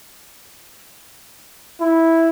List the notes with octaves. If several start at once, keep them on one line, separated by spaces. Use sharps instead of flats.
E4